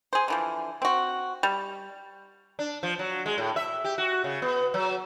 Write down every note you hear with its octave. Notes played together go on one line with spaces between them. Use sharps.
G#4 C5
D3 E3 F3
C4 F#4
G3
D4
F3
F#3
G#3
A2
E5
G4
F#4
C#3
B3
F#3